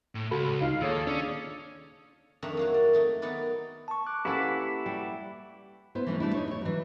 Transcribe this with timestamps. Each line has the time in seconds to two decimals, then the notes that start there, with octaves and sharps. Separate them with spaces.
0.15 A2
0.31 C#2 F#4 A4 B5
0.61 D2 D#4 F4 F5
0.81 D#3 A#3 G#4 A4 C#5 E6
1.07 C#4 D4 D5
2.42 F2 D#3 D4 C#5 E5 A#5
2.57 F#3 A#3 F#4
2.74 A#4 D5
2.93 F#3 A3 D#4
3.22 D#3 B3 D#4 A#4 B4 D5
3.88 A5 C#6
4.06 D6 F#6
4.25 A#3 C#4 E4 G4 A4 B4 F#5 B6
4.86 G3
5.95 B3 E4 C5
6.06 E3 F#3 A3 C#4 D4 E4
6.20 G3 A3 D4 E4
6.34 D#4 C#5
6.48 C5 C#5
6.61 E3 F#3